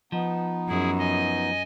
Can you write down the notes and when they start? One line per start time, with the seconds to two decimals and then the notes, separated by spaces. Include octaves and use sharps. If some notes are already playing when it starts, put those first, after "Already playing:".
0.12 F3 B3 D#4
0.68 F#2 E4 G#4
0.99 D#5 G#5